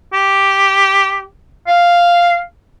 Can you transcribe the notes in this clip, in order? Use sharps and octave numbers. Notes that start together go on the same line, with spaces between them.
G4
F5